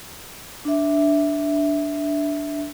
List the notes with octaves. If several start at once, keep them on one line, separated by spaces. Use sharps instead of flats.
D4 E5